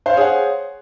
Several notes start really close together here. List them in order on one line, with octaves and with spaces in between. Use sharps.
C5 F5 C#5 G#4 F#5